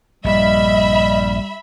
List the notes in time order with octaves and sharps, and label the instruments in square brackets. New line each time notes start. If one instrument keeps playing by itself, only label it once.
[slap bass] A#1 G2 [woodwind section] G3 [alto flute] D#5 [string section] E5 B5